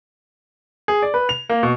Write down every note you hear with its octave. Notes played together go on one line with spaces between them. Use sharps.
G#4
D5
B4
F7
A#3
B2